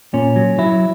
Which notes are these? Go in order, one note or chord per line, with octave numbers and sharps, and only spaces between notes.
A#2 C#4
F#3
F#3 E4